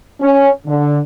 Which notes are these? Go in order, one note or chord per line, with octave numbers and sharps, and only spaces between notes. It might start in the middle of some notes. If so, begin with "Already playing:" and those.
C#4
D3